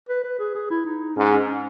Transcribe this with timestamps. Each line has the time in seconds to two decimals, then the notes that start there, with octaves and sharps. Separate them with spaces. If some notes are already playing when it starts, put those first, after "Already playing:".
0.09 B4
0.24 B4
0.39 G#4
0.55 G#4
0.71 E4
0.85 D#4
1.17 G#2 C#4
1.32 C#4
1.48 C#4